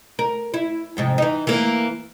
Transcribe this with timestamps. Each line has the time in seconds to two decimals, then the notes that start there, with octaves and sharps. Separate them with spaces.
0.19 A#4
0.54 E4
0.97 F2 G#2 C3
1.18 E3 D#4
1.47 E3 A#3